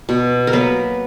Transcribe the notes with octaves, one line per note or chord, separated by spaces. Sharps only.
B2
A#4
F#3 A#3 B3 B4